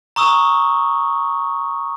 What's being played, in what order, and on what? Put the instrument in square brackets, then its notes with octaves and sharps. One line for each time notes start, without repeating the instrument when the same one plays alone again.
[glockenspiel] A#5 C#6 D#6 E6